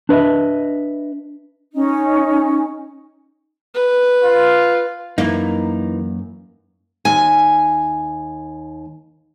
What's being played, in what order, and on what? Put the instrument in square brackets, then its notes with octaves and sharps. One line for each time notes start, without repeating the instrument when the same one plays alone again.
[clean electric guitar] D4 B4 D#5 E5
[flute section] C#4 D#4
[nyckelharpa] B4
[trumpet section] F4
[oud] F#2 A#3 E4 [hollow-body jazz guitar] E3 D#4
[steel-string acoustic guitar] D#2 G#5